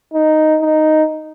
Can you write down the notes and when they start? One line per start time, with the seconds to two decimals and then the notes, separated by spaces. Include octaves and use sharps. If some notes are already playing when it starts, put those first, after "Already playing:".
0.14 D#4
0.61 D#4